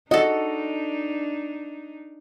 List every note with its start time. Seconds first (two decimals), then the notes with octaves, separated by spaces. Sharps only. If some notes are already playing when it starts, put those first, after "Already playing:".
0.11 D4 D#4 F#4 A4 D#5